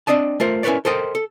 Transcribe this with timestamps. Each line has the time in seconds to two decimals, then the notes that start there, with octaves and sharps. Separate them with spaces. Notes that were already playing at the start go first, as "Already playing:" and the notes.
0.07 C4 D4 D5 D#5 A5
0.40 A3 F4 A#4 C5
0.63 C#4 E4 A#4 B4 C#5 D5
0.85 A4 A#4 C5 D#5 G5
1.15 A4